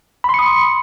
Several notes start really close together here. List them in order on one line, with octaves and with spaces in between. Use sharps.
B5 C6 C#7 D#6